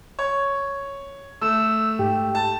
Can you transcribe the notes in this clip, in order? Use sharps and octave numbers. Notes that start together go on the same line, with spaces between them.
C#5
A3 E6
G#2 G4
A5